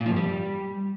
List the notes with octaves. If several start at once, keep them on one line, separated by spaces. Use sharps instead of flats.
A#2
F3
G2
G3